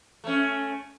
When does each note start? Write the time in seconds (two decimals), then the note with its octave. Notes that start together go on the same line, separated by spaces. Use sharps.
0.24 A3 C#4